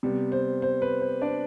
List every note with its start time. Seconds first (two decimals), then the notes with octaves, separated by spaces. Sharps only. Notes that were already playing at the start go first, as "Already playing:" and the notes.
0.03 C3 G3 B3
0.32 C5
0.62 C5
0.82 B4
1.01 C5
1.21 D4 D5